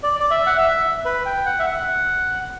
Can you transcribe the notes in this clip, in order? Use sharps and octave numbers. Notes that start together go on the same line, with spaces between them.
D5
D5
E5
F#5
E5
B4
G5
F#5
E5
F#5